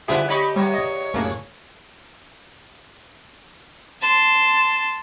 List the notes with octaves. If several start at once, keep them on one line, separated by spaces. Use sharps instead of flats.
D3 F3 G3 B3 E4 G#4 D5
A3 D#4 G4 C#5 D#5 B5 C#6
E2 G3 C#5
D#5
F#2 A2 A#3 C#4 D4 E4 G#4
A5 C6